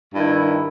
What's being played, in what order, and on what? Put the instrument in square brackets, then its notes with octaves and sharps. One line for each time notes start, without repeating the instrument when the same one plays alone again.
[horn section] G2 D#3 E4